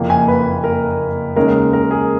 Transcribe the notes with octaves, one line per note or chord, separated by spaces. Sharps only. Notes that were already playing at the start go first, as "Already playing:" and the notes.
Already playing: F#1 F2 F3 A#3
G#5
B4
A#4
D#2 C#3 G#3 C#4 A#4
A#4
G#4